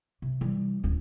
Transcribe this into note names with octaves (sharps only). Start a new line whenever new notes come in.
C3
E3 G3
D1 C#4